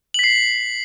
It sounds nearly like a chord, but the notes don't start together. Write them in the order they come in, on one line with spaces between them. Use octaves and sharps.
F#7 B6 C7